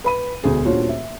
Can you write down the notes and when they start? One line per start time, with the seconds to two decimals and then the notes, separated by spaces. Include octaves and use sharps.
0.04 B4 B5 D#7
0.44 E1 D2 G#4
0.65 D#1 D4 F4 F#4 C#5
0.89 E5